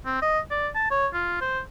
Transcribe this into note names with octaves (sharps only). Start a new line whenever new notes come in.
C4
D#5
D5
A5
C#5
F4
C5